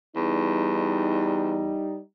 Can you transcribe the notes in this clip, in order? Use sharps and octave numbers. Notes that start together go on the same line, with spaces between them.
E2 G3 D#4